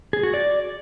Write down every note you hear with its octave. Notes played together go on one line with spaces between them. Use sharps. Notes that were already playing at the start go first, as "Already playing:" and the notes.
G#4
F#4
D5